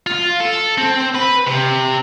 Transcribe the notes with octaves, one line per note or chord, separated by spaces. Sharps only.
F4
A4
C4
B4
C3